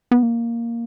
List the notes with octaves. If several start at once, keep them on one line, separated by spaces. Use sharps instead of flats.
B3
A#3